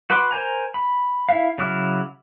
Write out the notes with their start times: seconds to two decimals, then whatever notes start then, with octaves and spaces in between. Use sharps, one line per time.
0.10 F#4 B4 B5 C6 D6
0.31 A#4 C5 G#5 A#5
0.74 B5
1.29 E4 E5 F5
1.58 C#3 F#3 E4 D6 F6